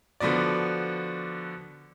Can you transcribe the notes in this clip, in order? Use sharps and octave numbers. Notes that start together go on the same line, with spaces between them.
D3 F3 B3 F#4 D5